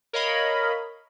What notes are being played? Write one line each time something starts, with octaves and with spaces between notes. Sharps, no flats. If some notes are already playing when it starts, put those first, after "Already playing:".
A#4 C#5 D#5 F5 B5